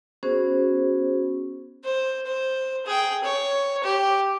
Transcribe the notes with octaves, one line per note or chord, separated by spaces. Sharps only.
B3 C#4 F#4 G#4 C5
C5
C5
G#4 G5
C#5
G4